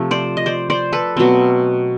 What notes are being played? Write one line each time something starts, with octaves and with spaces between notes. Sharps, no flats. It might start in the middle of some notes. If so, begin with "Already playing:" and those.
Already playing: C3 F3 A3
C5 D5
D#5
C5 D5
C5 D5
A4 B4
B2 F#3 A3 C4